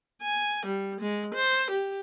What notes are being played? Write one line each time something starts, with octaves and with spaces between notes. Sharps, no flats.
G#5
G3
G#3
C5
G4